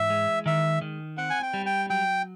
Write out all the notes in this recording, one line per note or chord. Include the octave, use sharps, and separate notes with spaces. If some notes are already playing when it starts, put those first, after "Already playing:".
Already playing: G#2 E3 E5
G#3
D#3 E5
D#3
C4 F#5
G#5
G5
G3
G5
F#3 G5